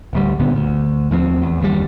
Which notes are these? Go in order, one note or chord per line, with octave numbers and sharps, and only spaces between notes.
D1 D2 G3
C#2 A#2 D3 B3
D2
D#2 F3 A3 C4
E2
F#1 D#2 C3 G3